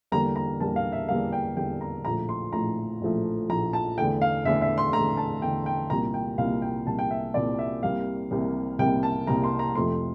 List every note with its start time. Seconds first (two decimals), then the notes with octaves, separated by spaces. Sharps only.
0.12 E2 D3 G3 A#3 A#5
0.36 A#5
0.60 E2 D3 G3 A#3 A5
0.76 F5
0.93 E5
1.08 E2 D3 G3 A#3 F5
1.33 G5
1.57 E2 D3 G3 A#3 G5
1.81 A#5
2.05 A#1 A2 F3 A3 A#5
2.29 C6
2.53 A#1 A2 F3 A3 A#5
3.01 A#1 A2 F3 A3
3.49 A#1 A2 F3 A3 A#5
3.73 A5
3.98 E2 D3 A3 G5
4.22 F5
4.45 E2 D3 A3 E5
4.62 E5
4.78 C6
4.93 E2 D3 A3 A#5
5.17 A5
5.42 E2 D3 A3 G5
5.66 G5
5.90 C2 A#2 G3 A#3 A#5
6.14 G5
6.38 C2 A#2 G3 A#3 F5
6.62 G5
6.87 C2 A#2 G3 A#3 A5
6.99 G5
7.11 E5
7.34 C2 A#2 G3 A#3 D5
7.59 E5
7.83 C2 C3 G3 A#3 F5
8.31 C2 C3 G3 A#3
8.79 C2 C3 G3 A#3 G5
9.03 A5
9.27 C2 C3 G3 A#3 A#5
9.44 C6
9.59 A#5
9.75 F2 C3 F3 A3 C6